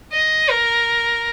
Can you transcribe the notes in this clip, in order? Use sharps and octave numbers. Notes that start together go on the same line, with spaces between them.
D#5
A#4